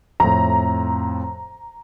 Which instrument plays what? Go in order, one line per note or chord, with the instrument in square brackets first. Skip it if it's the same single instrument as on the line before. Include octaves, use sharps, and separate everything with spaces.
[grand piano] F2 A2 [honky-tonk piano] A#5